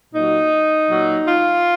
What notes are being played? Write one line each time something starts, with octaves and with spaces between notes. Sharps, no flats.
A#2 F#3 D#4
A#2 F#3
F4